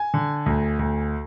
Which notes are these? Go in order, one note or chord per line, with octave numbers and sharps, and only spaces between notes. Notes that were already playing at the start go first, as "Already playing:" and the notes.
Already playing: G#5
D3
D2
D2